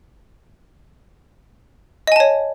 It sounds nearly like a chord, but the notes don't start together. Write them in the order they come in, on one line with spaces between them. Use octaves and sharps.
D#5 G#5 A5 C#5